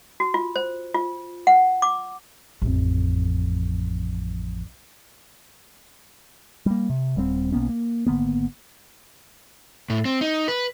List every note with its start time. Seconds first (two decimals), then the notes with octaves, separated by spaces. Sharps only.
0.20 F#4
0.34 F4
0.56 C5
0.95 F4
1.47 F#5
1.82 D6
2.62 A1 F2
6.66 G3 A#3
6.90 C3
7.16 D#1 G3 G#3 C4
7.52 B1 A#3 B3 C#4
7.69 A#3
8.07 G#1 D3 A#3 B3
9.90 A2
10.05 C4
10.21 D#4
10.48 B4